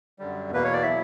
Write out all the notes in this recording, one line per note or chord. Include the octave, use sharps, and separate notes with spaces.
F#2 D3 G3
E2 B2 A#3 B4
C#5
D5
B2 F#3 B3 E4 E5